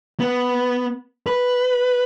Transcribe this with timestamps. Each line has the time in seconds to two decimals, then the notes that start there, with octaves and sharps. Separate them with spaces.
0.20 B3
1.27 B4